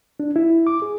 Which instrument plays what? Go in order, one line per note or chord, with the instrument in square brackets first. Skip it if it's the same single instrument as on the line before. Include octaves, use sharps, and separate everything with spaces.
[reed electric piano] D4
E4
D6
G#4